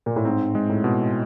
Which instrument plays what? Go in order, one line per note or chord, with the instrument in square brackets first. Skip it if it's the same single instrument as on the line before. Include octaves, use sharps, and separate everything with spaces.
[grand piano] A#2
A2
[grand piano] G#2 [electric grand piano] C4
[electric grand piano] G#3
[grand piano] A2
[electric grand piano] B2